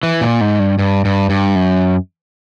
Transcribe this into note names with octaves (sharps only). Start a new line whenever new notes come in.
E3
A#2
G#2
G2
G2
G2
G2
F#2